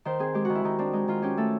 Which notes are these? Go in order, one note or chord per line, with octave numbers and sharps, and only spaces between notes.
D#3 C5
C4 G#4
G#3 G4
D#3 F#4
E4
D#3 D#4
C4 D4
G#3 D#4
D#3 F4
C#4 G4
A3 A4